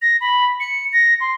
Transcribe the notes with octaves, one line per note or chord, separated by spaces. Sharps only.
A#6
B5
C#7
A#6
C6